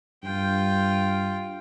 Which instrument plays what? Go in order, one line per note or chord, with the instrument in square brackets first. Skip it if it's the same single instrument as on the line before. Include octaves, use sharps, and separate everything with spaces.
[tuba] G2 [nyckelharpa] F4 G5